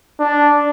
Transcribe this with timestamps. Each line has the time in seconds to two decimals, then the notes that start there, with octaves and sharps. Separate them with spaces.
0.20 D4